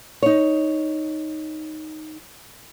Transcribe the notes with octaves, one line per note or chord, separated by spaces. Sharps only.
D#4 C#5